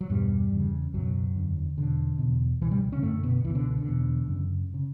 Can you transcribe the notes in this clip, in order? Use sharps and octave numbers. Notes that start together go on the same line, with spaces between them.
F#3
E2 G2 B2 G3
E2 C#3
C#2 F#2 B2 F#3
E2 D3
E2 B2 D3
E2 B2
C#2 B2 E3
G2 G3
C#3 C#4
F#2 A2 D3 A3
B2 B3
C#2 E3
B2
D3
D3
E2 B2
F#2 C#3
C#3